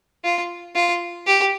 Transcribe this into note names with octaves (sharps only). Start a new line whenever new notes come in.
F4
F4
G4